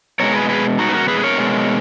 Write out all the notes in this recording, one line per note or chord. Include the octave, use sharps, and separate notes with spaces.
B2 G#3 A#4 C#5
G#4 B4
G#4 B4
D#4 F#4
B4
F#4 A#4
G#4 B4
B4
A#4 C#5
B2 G#3